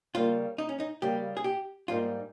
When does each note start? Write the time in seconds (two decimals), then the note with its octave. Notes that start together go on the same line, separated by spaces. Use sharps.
0.14 C#3 G3 A#3 F4
0.58 D#4
0.69 C#4
0.80 D#4
1.02 C#3 G3 A#3 G4
1.37 G#4
1.44 G4
1.88 G#2 G3 A#3 D#4 F4